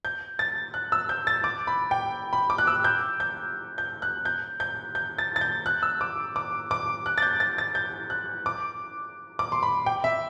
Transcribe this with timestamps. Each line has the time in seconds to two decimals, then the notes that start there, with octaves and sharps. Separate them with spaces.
0.05 G6
0.39 A6
0.74 F#6
0.92 E6
1.09 G6
1.27 A6
1.44 D6
1.67 B5
1.91 G5
2.33 B5
2.50 D6
2.58 F#6
2.67 E6
2.84 G6
3.20 G6
3.78 G6
4.02 F#6
4.25 G6
4.60 G6
4.95 G6
5.18 A6
5.36 A6
5.41 G6
5.66 F#6
5.83 E6
6.01 D6
6.36 D6
6.71 D6
7.06 F#6
7.18 A6
7.22 G6
7.40 A6
7.58 A6
7.75 G6
8.10 F#6
8.46 D6
9.39 D6
9.52 C6
9.63 B5
9.86 G5
10.04 E5